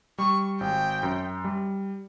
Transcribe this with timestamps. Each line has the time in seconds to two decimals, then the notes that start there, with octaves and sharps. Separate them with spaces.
0.18 G3 C#6
0.61 G#1 G5
1.03 F#2
1.44 G3